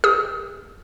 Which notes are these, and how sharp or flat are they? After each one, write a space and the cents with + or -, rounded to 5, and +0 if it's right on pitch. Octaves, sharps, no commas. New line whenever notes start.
G4 +35 D#6 +30